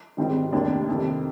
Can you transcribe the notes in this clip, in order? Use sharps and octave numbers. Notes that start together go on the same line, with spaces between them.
G#1 G#2 D#3 G3 C4
F1 D#2 D#3 G3 D4
F2 C3 D#3